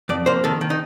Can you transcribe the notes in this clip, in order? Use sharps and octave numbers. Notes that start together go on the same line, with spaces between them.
F2 D5
A#3 C5
D#3 A4
D#3
D#4